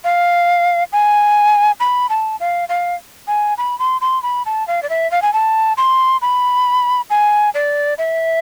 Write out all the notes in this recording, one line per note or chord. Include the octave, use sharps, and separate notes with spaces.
F5
G#5
B5
A5
F5
F5
G#5
B5
C6
C6
B5
A5
F5
D5
E5
F5
G#5
A5
C6
B5
G#5
D5
E5